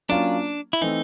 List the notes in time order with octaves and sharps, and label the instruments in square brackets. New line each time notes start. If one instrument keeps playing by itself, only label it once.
[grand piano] F#3 A#3 C#4 F4 [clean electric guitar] D4
[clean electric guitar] E4
[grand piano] E3 A3 C4 [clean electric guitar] D#4